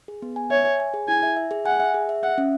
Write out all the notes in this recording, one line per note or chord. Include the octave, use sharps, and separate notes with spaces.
G#4
B3
G#5
C#5 E5
G#5
G#5
G#4
E4 G#5
E5
E5
G#4
F#5 G#5
E5
G#4
E5
E5 F#5
C#4